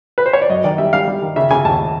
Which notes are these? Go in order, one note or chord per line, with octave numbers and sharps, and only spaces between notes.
B4
C5
C#5
D5
F#2 D#5
D#3 D5
G3 E5
G3 F5
G3
D#3
C#3 E5
C#3 G#5
D#2 A5